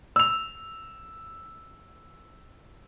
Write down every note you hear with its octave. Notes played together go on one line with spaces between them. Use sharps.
E6 F7